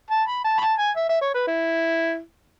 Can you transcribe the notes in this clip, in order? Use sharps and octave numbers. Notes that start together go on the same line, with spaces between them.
A5
B5
A5
B5
A5
G#5
E5
E5
C#5
B4
E4